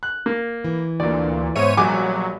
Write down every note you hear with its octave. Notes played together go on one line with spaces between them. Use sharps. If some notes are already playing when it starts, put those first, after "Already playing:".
F#6
A#3
E3
D2 A#2 D5
G#2 B3 C5 C#5 E5 D#7
A#1 F#3 G3 G#4 G#5 D6